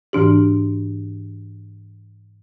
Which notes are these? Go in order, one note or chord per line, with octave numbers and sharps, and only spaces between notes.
G#2 E3 D4 G4